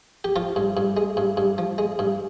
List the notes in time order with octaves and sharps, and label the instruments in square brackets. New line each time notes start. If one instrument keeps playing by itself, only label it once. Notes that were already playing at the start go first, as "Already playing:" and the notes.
[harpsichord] G4
F3 F4
G2
G2
G#3
G2
G2
F3
G#3
G2